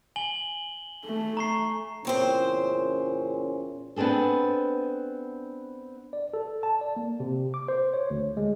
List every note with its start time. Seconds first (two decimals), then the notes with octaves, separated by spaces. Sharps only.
0.16 G#5 F#7 G7
1.05 A3
1.37 A#5 C#6 C7
2.05 E2 A#2 C#3 C4 C#4 C5
3.96 B3 C4 D4 G#4 A4
6.13 D5
6.34 A4
6.63 A5
6.81 D5
6.96 A#3
7.20 C3
7.54 D6
7.68 C5
7.94 C#5
8.10 D2
8.37 G#3